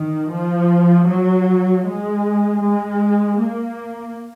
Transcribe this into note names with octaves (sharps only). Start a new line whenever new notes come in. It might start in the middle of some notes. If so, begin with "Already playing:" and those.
Already playing: D#3
F3
F#3
G#3
G#3
A#3